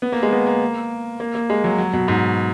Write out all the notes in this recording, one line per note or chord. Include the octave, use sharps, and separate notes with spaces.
B3
A#3
G#3
B3
A#3
A#3
A#3
G#3
F#3
F#3
B2
G#2